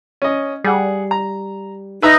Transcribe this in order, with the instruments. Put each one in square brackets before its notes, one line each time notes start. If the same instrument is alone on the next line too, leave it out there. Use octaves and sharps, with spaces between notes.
[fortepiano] C#4 D#5
[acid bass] G3 [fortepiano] G#4 F#5
[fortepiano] A#5
[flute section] D#4 [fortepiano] B4 E5 A#5